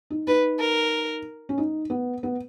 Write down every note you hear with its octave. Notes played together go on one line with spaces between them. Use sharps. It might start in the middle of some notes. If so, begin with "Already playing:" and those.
D#4
D#4 B4
A#4
C#4
D#4
B3
B3